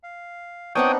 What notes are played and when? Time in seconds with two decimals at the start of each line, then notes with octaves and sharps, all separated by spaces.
0.03 F5
0.75 B3 C4 D4 D#4 C#5 F#5 G5 D#6